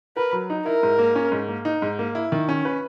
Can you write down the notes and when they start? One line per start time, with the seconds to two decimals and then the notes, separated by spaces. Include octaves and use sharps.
0.17 A#4 B4
0.33 F#3
0.50 D#4
0.66 E4 A#4
0.83 G#2
0.99 A#3
1.15 C#4
1.32 G#2
1.48 A#3
1.65 D#4
1.82 G#2
1.99 A#3
2.15 E4
2.32 D#3
2.49 C#4
2.65 B4